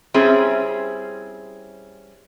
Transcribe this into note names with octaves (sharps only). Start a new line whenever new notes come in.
G3 C4 C#4 E4 G#4